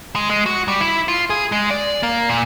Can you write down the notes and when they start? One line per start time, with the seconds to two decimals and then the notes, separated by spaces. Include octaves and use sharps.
0.16 G#3
0.30 G#3
0.46 F#4
0.68 G3
0.81 E4
1.08 F4
1.30 G#4
1.52 G#3
1.71 D5
2.03 A#3
2.30 A#2